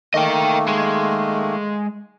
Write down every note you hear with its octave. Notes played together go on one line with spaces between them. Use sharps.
D#3 A3 A#3 D#5 G5
G#3 G#4